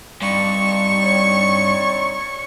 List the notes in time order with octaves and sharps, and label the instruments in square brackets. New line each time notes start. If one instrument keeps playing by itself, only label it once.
[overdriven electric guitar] G2 [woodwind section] C4 D#4 D5 [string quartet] C#6
[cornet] C#5